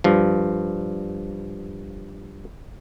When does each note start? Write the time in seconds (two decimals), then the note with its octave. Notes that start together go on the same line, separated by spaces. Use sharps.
0.04 G2 F3